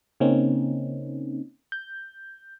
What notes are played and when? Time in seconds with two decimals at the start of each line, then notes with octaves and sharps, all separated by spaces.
0.20 C#3 A#3 C4 C#4 D#4
1.72 G6